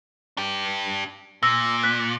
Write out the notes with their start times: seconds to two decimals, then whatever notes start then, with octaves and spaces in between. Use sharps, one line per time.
0.37 D4 G4
1.43 A#2 E6 A#6
1.83 F#6 B6